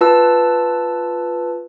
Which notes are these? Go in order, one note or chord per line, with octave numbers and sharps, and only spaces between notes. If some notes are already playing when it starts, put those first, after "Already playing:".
F4 B4 A5 E6